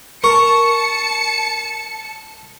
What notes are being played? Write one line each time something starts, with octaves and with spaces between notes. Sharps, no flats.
A#4 A5 C#6 C#7